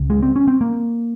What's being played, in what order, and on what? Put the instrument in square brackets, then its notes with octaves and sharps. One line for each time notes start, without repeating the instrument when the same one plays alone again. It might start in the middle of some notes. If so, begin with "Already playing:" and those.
Already playing: [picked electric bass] C#2 C#3
G#3
C4
C#4
C4
A#3